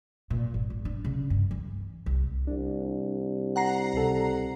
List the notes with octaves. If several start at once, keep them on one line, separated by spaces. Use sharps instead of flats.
A#2
G#1
G#1
D4
C#3
G2
E3
C2
C2 D4
F#5 A#5 C7
C#2 C3 A4